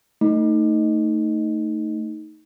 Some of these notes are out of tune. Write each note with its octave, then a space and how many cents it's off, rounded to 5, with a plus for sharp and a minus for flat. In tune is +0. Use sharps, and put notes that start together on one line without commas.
A3 +20 D#4 +5